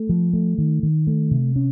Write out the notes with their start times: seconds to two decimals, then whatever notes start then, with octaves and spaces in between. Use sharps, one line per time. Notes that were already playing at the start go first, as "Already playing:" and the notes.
Already playing: A3
0.09 F3
0.33 A3
0.58 D#3
0.83 D#3
1.07 A3
1.31 C3
1.56 C#4